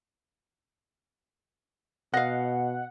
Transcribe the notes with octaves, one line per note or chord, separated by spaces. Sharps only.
B2 D#5 F5 F#5